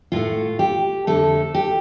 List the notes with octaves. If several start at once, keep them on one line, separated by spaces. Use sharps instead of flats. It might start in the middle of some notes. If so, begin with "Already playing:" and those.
A2 A3 F4
G4
F2 D3 A3 A4
G4